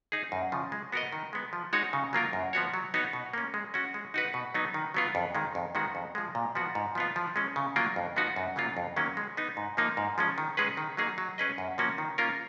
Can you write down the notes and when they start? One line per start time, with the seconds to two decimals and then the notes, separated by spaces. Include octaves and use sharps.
0.12 D#4 G#4
0.32 F#2
0.52 C#3 F3
0.72 G#3
0.92 B3 F#4 A#4 D#5
1.13 D#3
1.33 G#3 B3
1.53 F3
1.73 G#3 D#4 F#4 C#5
1.93 C#3
2.13 F#3 A#3 F4 A#4
2.33 F#2
2.53 F3 B3 F#4 C#5
2.74 F#3
2.94 B3 D#4 F#4 C#5
3.13 B2
3.33 A#3 C#4
3.54 G#3
3.74 C#4 F#4
3.94 G#3
4.14 D#4 F#4 B4
4.34 B2
4.54 F#3 B3 D#4
4.74 D#3
4.94 F#3 B3 F4
5.15 F2
5.35 D#3 G#3
5.55 F2
5.75 D#3 G#3 B3 F#4
5.95 F2
6.15 F3 G#3
6.35 A#2
6.55 F3 B3 F#4
6.75 G#2
6.95 F3 B3 F4
7.16 F3
7.36 G#3 C#4
7.56 C#3
7.76 F#3 A#3 F4 A#4
7.96 F2
8.16 F3 B3 D#4 F#4
8.36 F#2
8.56 C#3 F#3 A#3 F4
8.77 F2
8.96 D#3 F#3 A#3 C#4
9.17 G#3
9.37 B3 D#4
9.57 G#2
9.77 F3 A#3 D#4
9.97 G#2
10.18 F3 G#3 C#4
10.38 D#3
10.57 G#3 C#4 G#4 B4
10.77 D#3
10.97 F#3 A#3 D#4 G#4
11.18 F#3
11.38 C#4 G#4 B4 D#5
11.58 F#2
11.78 F3 A#3 C#4 F#4
11.98 D#3
12.18 A#3 C#4 F4 A#4